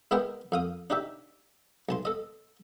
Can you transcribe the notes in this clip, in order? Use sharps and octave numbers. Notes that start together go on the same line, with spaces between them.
G#3 B3 E4 A#4 D#5 G5
F2 F5 D#6
D4 D#4 G4 E5
B1 A5 C6
A4 D#5